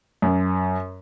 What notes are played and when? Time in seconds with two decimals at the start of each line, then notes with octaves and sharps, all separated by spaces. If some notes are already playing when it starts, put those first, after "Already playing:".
0.22 F#2